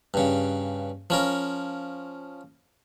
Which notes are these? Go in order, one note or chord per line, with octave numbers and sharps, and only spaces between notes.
G2 C#3
F3 C#4 A#4